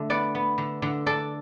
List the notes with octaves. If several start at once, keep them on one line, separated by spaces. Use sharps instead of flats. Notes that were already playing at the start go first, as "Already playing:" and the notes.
Already playing: D3 A3
B3 D5 F#5
B3
D3
D3
D4 A4 D5